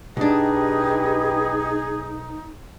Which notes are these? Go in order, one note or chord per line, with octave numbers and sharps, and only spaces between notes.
B1 D4 D#4 G4 G#4 B4 D#5